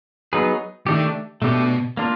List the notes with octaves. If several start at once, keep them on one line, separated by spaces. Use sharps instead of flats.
F#3 B3 D#4 G#4 B4
D#3 A3 D4 G4
B2 A3 D4 G4
A#3 D4 F4